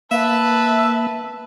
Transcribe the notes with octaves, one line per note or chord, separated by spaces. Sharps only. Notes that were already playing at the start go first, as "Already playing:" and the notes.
A#3 B4 E5 A5